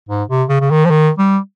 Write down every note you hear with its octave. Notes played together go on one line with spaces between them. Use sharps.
G#2
C3
C#3
C#3
D#3
F3
D#3
G3